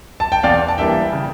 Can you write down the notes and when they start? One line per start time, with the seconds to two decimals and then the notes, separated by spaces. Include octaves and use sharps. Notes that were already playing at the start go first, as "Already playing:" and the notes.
0.20 A5
0.32 G5
0.43 E2 D5 F5
0.68 A5
0.78 E3 G3 A#3 D4 E5 G5
1.13 C#3